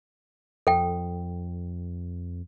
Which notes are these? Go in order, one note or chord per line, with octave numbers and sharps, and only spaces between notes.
F2 A4 G5